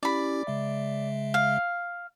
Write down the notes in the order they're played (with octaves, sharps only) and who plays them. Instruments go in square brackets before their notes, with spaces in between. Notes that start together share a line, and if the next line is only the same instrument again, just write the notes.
[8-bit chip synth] C#4 E4 G4 [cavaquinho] D5 B5
[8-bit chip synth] C#3 G#3 E5
[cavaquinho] F5